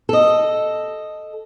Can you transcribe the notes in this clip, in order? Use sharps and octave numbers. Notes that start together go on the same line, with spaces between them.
A4 D#5